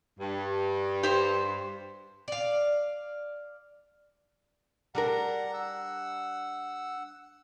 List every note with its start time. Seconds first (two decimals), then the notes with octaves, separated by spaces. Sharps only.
0.19 G2
1.03 G4 C5
2.28 D5 F5
4.95 G3 D4 A#4 F#5 A#5
5.54 F#5 E6